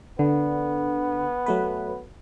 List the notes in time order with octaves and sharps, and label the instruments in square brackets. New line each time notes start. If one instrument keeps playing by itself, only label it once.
[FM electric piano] D3 [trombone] B3
[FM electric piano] F#3 A3 B4